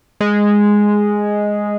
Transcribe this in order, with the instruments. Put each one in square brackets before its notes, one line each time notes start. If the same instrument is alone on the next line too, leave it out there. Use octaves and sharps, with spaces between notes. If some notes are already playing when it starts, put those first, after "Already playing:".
[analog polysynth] G#3